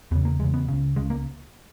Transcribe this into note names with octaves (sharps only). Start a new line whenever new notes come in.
E2 C#3 B3
A#3
E2 C#3 G#3
B3
C#2 C#3
C#2 C#3 G#3
A#3